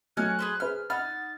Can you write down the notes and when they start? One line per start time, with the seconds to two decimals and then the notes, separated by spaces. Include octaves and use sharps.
0.17 F#3 A3 C#4 D#5 F6 F#6
0.39 G#4 B4 C5
0.60 G#4 B4 C5 F6
0.90 D#4 F#5 B5 F6 A6